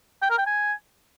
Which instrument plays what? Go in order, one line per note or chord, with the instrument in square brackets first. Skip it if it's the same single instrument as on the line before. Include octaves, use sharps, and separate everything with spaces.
[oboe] G5
A#4
G5
G#5